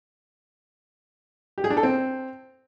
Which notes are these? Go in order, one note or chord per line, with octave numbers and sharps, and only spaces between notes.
G4
G#4
D4
A4
C4